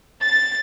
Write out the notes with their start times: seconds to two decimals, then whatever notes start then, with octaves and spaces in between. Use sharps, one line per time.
0.23 A6